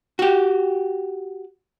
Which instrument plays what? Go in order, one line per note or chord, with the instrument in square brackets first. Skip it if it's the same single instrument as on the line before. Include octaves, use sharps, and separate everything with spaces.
[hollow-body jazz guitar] F#4 G4